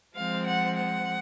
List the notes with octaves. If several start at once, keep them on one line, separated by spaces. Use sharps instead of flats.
F3 G#3 C4 F5
F#5
F#5